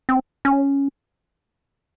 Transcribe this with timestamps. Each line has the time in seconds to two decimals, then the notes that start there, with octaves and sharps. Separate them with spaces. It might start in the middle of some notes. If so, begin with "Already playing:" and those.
0.09 C4
0.45 C#4